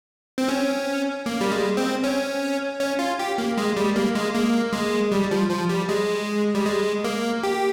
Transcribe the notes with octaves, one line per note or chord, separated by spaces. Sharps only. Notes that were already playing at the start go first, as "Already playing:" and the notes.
C4
C#4
A#3
G3
G#3
C4
C#4
C#4
F4
G4
A#3
G#3
G3
A#3
G#3
A#3
G#3
G3
F3
F3
G3
G#3
G3
G#3
A#3
G4